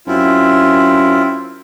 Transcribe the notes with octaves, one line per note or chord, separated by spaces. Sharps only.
F#2 C4 E4 F4